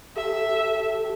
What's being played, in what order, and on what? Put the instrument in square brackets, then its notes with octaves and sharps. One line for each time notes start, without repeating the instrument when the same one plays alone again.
[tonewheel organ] G4 A4 [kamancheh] E5